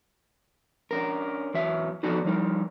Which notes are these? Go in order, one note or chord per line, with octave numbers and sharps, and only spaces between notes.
C#4 D4 A#4
E2 F#3 E5
F3 B3 D4 D#4 F#4 A4
F3 G3 D#4 A#4